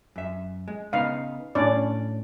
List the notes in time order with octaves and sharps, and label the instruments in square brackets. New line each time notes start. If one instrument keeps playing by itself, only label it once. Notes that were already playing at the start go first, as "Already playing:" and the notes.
[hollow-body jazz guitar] F#2 E5
G#3
[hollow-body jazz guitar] C#3 B3 D#4 [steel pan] F5
[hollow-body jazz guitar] A2 [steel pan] C#4 D4 D5